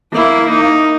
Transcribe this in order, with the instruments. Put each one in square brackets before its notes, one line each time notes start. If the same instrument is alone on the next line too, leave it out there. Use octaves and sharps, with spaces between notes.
[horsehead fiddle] A#3 [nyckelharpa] E4
[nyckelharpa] D#4